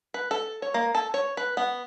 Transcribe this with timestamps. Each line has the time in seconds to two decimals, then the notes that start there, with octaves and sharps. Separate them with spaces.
0.14 B4
0.31 A4
0.62 C#5
0.74 A#3
0.95 A4
1.14 C#5
1.37 B4
1.57 B3